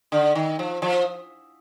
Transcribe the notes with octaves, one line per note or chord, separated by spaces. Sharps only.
D3
D#3
F3
F3